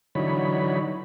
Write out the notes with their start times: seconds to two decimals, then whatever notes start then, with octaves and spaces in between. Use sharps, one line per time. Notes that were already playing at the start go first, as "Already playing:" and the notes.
0.15 D3 E3 F#3 D#4 C#5 B5